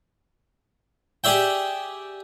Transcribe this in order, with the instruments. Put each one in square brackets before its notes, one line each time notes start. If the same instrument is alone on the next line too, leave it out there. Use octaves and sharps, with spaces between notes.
[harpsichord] G4 G#4 D5 E5 G5